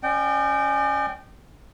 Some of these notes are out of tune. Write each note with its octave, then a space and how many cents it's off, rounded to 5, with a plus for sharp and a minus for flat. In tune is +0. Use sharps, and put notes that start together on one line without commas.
C#4 +0 D5 +45 G5 -20